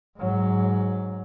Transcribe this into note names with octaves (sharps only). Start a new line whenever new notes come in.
G#2 F#3